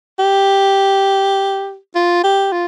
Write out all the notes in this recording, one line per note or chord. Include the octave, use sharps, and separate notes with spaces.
G4
F4
G4
F4